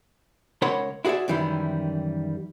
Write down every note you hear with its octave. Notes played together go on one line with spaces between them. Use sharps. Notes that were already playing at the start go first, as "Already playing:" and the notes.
C#2 A#4 C#5 F#5 B5 C6
E4 F#4 G#4 B4 D5 E5
F#2 D#3 E3 G3 E4